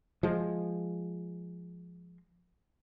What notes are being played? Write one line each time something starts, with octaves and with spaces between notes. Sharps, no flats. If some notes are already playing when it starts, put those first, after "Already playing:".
F3 G#3